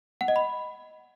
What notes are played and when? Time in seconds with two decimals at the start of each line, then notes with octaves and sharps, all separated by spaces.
0.21 F#5
0.28 D#5
0.36 B5